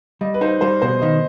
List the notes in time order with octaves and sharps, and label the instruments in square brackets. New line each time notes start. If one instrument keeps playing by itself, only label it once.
[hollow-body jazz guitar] G3 [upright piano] D#5
[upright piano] B4
[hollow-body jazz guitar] D#4 [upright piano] C5
[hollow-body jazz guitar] G3 [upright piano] C5
[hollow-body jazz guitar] B2 [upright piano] C5
[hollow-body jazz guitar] D#3 [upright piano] D#5